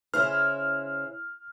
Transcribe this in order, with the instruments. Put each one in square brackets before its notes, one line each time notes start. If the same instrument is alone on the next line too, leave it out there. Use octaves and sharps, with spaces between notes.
[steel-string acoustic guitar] C#3 E4 C5 [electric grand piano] F6